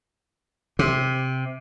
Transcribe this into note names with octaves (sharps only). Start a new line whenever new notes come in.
C3